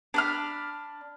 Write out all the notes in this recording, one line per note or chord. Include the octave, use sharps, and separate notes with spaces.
D4 B5 F6